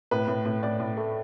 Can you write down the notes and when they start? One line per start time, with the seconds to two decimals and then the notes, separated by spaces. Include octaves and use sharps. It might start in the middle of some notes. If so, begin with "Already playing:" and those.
0.11 A2 B4
0.28 A2
0.45 A2
0.63 A2 D5
0.80 A2
0.97 A3